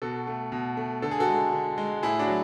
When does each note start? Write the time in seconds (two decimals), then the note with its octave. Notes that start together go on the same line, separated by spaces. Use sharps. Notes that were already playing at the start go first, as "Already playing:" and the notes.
0.02 B2 F#4 A4
0.27 A3
0.52 B2
0.77 A3
1.02 D3 A4
1.11 G#4
1.20 F#4 A4
1.28 G#3
1.53 D3
1.78 G#3
2.03 A2 E4 G#4
2.19 D4 F#4
2.28 F#3